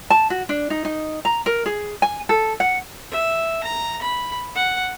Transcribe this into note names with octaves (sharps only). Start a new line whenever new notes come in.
A5
F#4
D4
D#4
D#4
A#5
A#4
G#4
G#5
A4
F#5
E5
A#5
B5
F#5